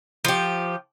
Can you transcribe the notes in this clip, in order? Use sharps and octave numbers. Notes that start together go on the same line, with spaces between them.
F3 G4